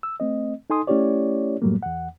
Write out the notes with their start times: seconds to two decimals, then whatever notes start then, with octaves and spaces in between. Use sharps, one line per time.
0.03 E6
0.20 A3 C4 D#5
0.70 D#4 A4 G#5 C6 D#6
0.87 A3 C#4 E4 G4 C#5 D5
1.62 F#2 A2 F#3 G3 A3 A#3
1.83 E2 F#5